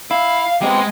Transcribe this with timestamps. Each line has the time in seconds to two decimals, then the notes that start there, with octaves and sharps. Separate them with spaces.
0.11 E4 F5
0.62 G#3 B3 C4 G4 D#5